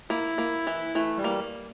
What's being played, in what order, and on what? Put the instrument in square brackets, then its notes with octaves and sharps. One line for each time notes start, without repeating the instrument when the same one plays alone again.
[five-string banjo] A#3 [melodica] E4
[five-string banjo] A#3
E3
[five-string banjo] E3 [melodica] A3
[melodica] G3
[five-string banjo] A#3